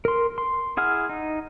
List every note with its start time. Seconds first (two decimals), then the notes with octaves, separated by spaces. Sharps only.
0.05 A#4 C6
0.38 C6
0.77 E4 G#4 F#5 F6
1.09 D#4